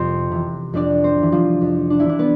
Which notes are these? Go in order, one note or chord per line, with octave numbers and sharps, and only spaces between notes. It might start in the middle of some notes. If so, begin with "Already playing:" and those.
Already playing: F2 C3 C4 C5
C3 E3
F2 D4 D5
C4 C5
C3 E3
F3 F4
F2
D4
E4
C3 E3 D4
B3 B4